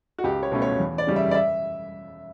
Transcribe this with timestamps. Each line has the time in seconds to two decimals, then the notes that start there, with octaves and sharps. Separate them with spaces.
0.18 F#4
0.24 C#2 G4
0.43 C#5
0.52 B2 A3 C#4
0.62 C#5
0.79 E2
0.98 D5
1.07 C#3 G3 C#4
1.16 E5
1.31 D5
1.34 E5